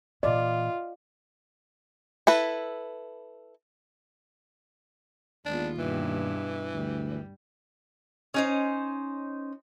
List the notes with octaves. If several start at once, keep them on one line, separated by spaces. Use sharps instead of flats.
A#2 E3 F4 D5 D#5
E4 A4 B4
D#2 G#3 B3 D4 F4
G2 B2 E3
D2 G3
C#4 D#4 C5